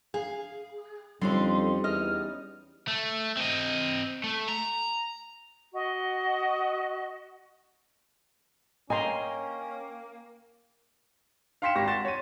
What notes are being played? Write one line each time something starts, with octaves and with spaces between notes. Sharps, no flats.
G#4 F5
F2 D3 G3 C#4 D#4 C6
E2 D#5 F6
A3
C4 D#5
A3
A#5
F#4 D#5
A#3 C#4 D#5 G5 G#5 A#5 C6
F5 G5 C6 B6 C#7 E7
G#1 G4 C#6 A#6
F#5 C6 A6 E7
C#5 D#7